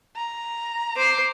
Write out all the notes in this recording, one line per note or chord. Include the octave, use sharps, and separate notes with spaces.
A#5
C5 D6 C7